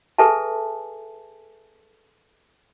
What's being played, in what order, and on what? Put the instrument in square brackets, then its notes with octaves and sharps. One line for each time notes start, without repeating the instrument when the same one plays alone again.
[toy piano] G#4 A4 B4 E5 G#5 A5